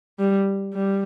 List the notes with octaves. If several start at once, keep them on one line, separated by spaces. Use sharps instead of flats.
G3
G3